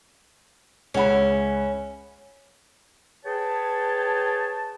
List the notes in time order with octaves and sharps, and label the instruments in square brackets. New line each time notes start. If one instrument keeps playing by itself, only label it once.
[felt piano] C#2 F#5 B5 [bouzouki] C#4 E4
[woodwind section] G#4 B4 C#5 G5 A5